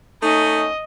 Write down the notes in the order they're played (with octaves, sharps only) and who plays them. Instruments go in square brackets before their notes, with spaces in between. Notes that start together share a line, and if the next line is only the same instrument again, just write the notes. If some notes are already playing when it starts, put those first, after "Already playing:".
[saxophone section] A3 C#4 D#4 [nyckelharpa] D#5